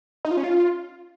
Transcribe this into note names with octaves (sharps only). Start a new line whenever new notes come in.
D#4
F4
C#4
F4